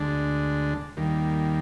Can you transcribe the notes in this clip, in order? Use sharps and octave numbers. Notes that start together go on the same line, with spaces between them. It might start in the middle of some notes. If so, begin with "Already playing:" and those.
Already playing: D2 D3 G#3 D4
D#2 D#3 G3 A#3